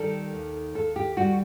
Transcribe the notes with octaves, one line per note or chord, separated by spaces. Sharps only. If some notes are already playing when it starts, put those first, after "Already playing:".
Already playing: D#3 G3 A4
D#2
D#2 A4
G4
G3 F#4